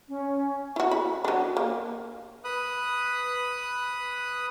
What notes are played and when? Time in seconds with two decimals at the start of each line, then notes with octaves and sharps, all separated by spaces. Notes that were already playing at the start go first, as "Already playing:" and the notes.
0.09 C#4
0.76 E4 F#4
0.91 B5
1.25 F#3 D4
1.57 A#3
2.44 B4 D#6 F#6